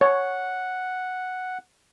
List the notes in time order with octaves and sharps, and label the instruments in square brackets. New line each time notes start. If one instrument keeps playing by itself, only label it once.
[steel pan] C#5 [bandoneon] F#5